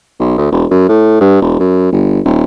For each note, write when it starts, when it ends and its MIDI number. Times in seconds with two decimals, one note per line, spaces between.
0.20 0.37 35
0.38 0.47 38
0.52 0.65 28
0.71 0.85 42
0.89 1.18 45
1.21 1.39 43
1.42 1.56 28
1.59 1.89 42
1.92 2.20 31
2.25 2.44 27